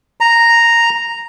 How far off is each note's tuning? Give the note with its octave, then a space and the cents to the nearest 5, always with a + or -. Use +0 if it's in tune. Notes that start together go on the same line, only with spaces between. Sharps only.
A#5 -5